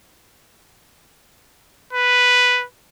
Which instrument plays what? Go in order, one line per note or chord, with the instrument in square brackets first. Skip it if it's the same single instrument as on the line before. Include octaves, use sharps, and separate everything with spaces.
[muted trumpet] B4